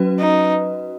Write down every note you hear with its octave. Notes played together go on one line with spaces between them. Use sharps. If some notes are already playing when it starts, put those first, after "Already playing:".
Already playing: F#3 C#4 F#4 B4
D#4